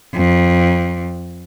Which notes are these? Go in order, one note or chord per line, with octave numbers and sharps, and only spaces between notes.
F2